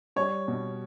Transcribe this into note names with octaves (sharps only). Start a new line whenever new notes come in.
G3 C#5
B2